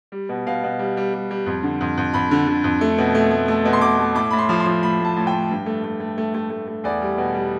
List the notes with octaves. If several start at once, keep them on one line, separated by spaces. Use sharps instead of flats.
G3
B2
B2 F5
B2
G3
G3
G3
G3
F2
D3
F2
F2
F2 B5
D3
D3
F2
A3
B2
A3
A3
A3
B2
C6
B2 D6
A3
A2 D6
A2 B5
C6
F3
C6
F3
A2 B5
A2 A5
A2
G5
A2
G2
A3
A3
A3
A3
A3
A3
A3
E2 D5
G3
B2
G3